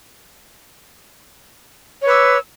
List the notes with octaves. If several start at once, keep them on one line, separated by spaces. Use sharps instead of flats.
B4 C#5 D6 E6